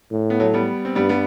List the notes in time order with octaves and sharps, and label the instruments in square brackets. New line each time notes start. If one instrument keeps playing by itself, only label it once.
[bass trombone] A2
[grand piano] B3
F#3 A3
G3 B3
C4
[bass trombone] G2 [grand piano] G3 B3
[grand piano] G3 B3